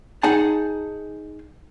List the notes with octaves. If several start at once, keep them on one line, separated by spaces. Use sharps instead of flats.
D#4 G#4 F#5 A5